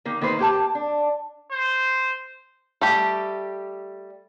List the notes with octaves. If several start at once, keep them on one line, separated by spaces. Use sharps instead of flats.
D#3 A#3
D#3 A#3 B4 C5
A#3 G4 A5
D4
C5
G3 A3 G4